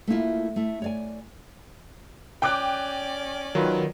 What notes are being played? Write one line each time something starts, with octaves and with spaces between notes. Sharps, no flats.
A3 A#3 E4 F4
A3 E4
C#5 D5 G#5
C#4 D5 G5 D6 F#6
D#3 F#3 F4 B4